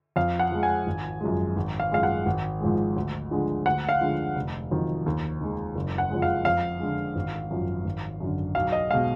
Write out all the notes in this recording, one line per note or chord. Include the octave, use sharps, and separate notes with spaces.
F2 F5
F#5
F3 G#3
G#5
G#1
F#2 F3 G#3
G#1
F5
F#2 F3 G#3 F5
F#5
G#1
G#2 F3 G#3
D2
D3 F3 G#3
D2 F#5
F5
D3 F3 G#3
F1
F2 D#3 F#3
D#2
D#3 G#3
F#1
F#5
F2 F3 G#3
F5
F2 F5
D3 G#3
G#1
F#2 F3
G#1
F#2 D3
B1 F5
D#5
B2 G#3 F5